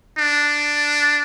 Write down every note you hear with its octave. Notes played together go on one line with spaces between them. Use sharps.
D4